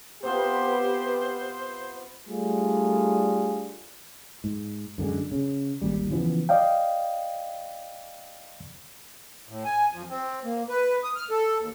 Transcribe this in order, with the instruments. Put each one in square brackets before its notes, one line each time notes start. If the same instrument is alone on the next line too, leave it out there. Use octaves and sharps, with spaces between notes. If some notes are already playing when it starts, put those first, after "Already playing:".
[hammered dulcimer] C3 B3 F4 [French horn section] G4 B4 [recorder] C5
[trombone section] G3 A3 D4 F4 G#4
[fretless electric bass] G#2
F#2 D3 D#3 G#3
C#3
G#1 D#2 G3
C#3 E3 F3 B3
[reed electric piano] D5 D#5 F5 G5
[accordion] A2
G#5
F2
C4
A#3
B4
D#6
F6
A4
D#2